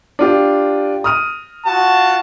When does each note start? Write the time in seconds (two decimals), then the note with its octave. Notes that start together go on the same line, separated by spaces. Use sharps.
0.19 D4 F4 G4
1.04 D#6 F6 D#7
1.65 F4 F#4 A5